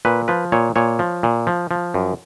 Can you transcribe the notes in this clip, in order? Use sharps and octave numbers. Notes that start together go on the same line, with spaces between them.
A#2 B4
F3 B4
A#2 C#5
A#2 C#5
F3
A#2
F3
F3
F#2